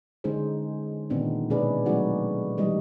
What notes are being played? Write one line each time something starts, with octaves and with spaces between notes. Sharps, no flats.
D3 G#3 C#4 D#4 G#4 C5
A#2 D#3 B3 C4 D4 D#4
B2 G#3 C#4 G#4 B4 D5
F#3 A3 C4 D#4 F#4 D5
E3 G3 G#3 D#4 D#5